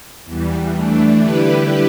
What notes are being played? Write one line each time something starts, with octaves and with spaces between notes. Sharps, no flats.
E2 E3 G3
E3 A3 D4
D3 G3 E4 G4 B4